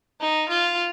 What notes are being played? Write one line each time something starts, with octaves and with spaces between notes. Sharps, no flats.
D#4
F4